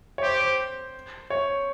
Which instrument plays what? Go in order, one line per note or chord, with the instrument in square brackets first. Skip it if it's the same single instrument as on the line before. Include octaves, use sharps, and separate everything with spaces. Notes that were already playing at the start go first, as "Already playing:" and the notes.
[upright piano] C#5
[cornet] G4 [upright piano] C5
[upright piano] C5
C#5